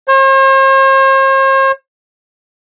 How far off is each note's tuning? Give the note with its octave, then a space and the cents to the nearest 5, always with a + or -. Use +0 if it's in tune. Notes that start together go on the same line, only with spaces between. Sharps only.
C5 +45